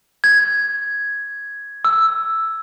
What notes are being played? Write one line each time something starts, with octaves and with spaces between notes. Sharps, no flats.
G#6
E6